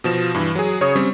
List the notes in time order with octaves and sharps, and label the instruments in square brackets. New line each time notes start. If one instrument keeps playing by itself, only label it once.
[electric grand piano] B2 F3 E7
G2 E3
F#3 G#4
C#3 C#5 C#6 D#6
G3 C4 C#4